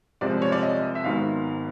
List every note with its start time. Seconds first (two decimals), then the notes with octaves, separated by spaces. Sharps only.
0.21 C2 C3 F3 G#3 C4 D5
0.42 C#5
0.52 D5
0.63 D#5
0.95 E5
1.04 G#1 G#2 D#3 F#3 B3 F5